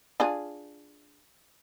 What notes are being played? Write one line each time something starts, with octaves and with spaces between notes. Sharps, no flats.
D4 F4 G#4